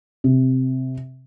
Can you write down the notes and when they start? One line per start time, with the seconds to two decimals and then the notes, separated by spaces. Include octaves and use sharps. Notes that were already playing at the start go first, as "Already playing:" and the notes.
0.24 C3